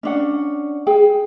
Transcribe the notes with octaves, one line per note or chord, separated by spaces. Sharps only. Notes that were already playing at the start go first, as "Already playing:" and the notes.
C#4 D4 F#5
G#4 G5